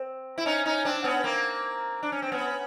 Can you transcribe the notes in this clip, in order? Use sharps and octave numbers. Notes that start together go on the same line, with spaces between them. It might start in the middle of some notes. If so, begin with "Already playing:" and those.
Already playing: C4
E4
C#4 D#4
C#4 D#4
C4 D4
B3 C#4
A#3 C4
D4
C#4
C4
B3 C#4